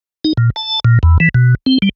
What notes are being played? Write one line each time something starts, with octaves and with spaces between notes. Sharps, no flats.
D#4
A#2
A5
A#2
E2
E3
B2
C4
G3